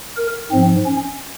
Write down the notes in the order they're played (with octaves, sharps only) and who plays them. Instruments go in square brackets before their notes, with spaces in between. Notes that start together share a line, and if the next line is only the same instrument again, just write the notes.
[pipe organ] A#4
G#2 F3 C4
C#4